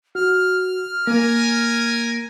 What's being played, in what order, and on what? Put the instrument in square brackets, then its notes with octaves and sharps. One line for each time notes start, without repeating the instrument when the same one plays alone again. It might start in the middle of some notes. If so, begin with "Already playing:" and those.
[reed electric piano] F#4 [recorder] F6
[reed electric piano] A#3 [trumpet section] A#4 G#5